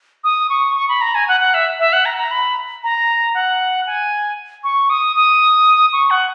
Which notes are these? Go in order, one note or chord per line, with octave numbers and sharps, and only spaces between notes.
D#6
C#6
C#6
B5
A#5
G#5
F#5
F#5
E5
E5
F#5
A#5
A#5
B5
A#5
F#5
G#5
C#6
D#6
D#6
C#6
F#5